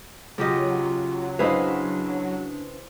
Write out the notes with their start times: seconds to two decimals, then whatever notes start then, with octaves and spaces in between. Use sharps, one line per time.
0.38 C#3 F#3 F4 G4 D#5
1.39 D4 E4 G#4 B4 C5 D#5 F5